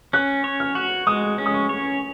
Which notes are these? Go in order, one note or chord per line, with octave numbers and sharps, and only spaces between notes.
C#4 F#6
C#5
F6
F#4
G#3 D#6
C#4
D#6
C#6
C#5